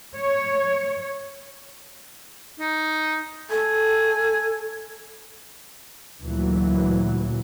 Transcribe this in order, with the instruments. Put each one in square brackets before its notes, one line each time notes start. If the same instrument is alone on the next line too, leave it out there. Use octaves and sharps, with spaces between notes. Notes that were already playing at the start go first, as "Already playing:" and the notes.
[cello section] C#5
[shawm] D#4
[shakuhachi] A4 [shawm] G#5
[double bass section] D2 A#2 E3 F#3